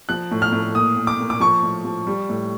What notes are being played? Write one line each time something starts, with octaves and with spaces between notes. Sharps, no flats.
F3 F#6
A2
F6
A2
A#2 D#6
A#2
D6
A#2
D6
F3 C#6
A2
F3
G3
A2